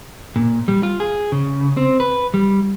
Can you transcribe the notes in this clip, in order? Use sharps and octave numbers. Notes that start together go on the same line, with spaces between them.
A#2
G3
F4
G#4
C#3
C4
B4
G3